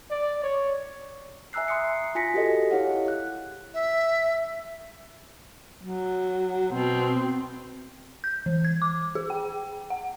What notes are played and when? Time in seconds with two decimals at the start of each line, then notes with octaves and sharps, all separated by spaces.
0.11 D5
0.43 C#5
1.53 E5 G#5 A#5 E6 F#6 C7
1.68 B5 C6 D#6 C7 C#7
2.15 F4 G#5 A#6 B6 C#7
2.34 F#4 G4 A4 D#5
2.71 E4 G4 G#4 C#5 F5 F#5
3.08 F#6
3.74 E5
5.84 F#3
6.72 B2 C4
8.24 G6
8.46 E3
8.65 G#6
8.82 D6
9.15 G#4
9.30 G5
9.90 F#5